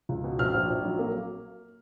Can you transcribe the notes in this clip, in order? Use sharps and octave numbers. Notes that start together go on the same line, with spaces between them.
C#2
B2
A#1 F6
A#1
A#1
F#3
A#3